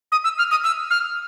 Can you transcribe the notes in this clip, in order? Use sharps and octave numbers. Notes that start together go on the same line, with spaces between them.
D#6
E6
F6
D#6
E6
F6